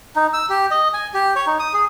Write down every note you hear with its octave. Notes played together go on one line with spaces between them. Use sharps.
D#4
E6
G4
D#5
G#5
G4
C#5
D#4
D#6
G#4